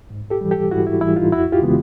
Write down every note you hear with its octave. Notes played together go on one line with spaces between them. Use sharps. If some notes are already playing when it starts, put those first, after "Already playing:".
G#2
G4 A4
E3 G3
G4 A4
G#2 E4 F#4
E4
E3 G3 E4
D#4 F4
F2 E4 F#4
F4 G4
C#3 E3 G#3 B3